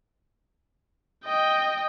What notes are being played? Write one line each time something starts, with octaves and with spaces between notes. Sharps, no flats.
D#5 G5